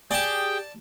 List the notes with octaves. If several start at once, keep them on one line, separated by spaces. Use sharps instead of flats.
G4 G#4 D5 G5 A5